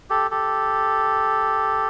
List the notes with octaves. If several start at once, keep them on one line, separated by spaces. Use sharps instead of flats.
G4 A4
G4 A4